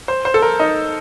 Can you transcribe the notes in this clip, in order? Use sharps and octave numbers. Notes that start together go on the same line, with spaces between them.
C5
C5
A4
A#4
D#4